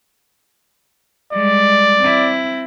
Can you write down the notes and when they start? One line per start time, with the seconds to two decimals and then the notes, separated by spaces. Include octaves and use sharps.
1.33 G3 G#3 D5
2.00 C4 E4